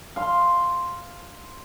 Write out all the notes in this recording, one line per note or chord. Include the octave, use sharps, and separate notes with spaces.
F5 C6